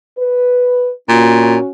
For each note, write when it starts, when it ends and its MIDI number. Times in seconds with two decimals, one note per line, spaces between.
0.18 0.90 71
1.09 1.57 46
1.09 1.70 61
1.09 1.70 66